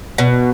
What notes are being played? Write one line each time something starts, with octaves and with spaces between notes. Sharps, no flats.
B2